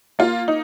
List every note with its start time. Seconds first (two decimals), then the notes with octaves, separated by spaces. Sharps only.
0.19 A#3 F4
0.48 D#4